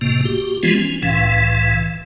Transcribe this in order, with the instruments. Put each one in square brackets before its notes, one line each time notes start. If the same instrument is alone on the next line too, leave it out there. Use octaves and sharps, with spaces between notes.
[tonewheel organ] G#1 A2 C3 A#3
F#4 G4
E3 F3 G#3 B3 F4
C#4
C2 A2 E3 F5